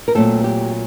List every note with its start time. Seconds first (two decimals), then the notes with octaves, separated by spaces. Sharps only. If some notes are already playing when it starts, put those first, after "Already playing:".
0.08 A#4
0.15 A#2 F#3 A3 C4 A4
0.44 G4